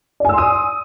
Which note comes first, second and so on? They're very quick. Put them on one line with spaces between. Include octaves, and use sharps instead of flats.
D5 G#5 E6 C6 D#6